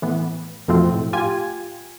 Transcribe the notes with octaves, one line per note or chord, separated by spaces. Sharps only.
A2 E3 B3
F2 B2 F3 A3 C4
A2
F4 G4 G#5